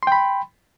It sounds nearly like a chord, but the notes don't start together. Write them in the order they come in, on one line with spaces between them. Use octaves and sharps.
C6 G5 B5